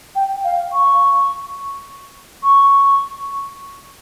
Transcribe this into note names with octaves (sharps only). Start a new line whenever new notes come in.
G5
F5
C#6
C#6